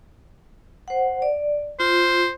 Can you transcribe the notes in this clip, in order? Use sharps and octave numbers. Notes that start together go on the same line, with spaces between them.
C5 F#5
D5
F4 C5